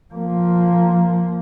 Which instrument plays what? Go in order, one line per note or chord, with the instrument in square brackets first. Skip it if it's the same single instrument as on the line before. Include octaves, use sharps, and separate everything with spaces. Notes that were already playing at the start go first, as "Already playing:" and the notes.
[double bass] F3 A#3